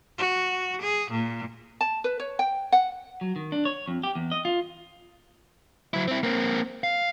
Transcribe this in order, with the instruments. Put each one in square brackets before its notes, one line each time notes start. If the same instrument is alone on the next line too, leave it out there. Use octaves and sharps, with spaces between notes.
[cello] F#4
G#4
A#2
[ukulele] A5
B4
C#5
G5
F#5
[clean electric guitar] F#3
D#3
D4
C#5
F2
G4
E2
D#5
F4
[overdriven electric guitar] F#3 E4
C4 E4
A#3 C4
F5